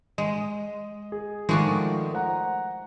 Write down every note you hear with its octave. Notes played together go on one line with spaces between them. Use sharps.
G#3 D#5
G#4
D#3 F3 G#3 A3 F#4 D5
C5 F#5 A#5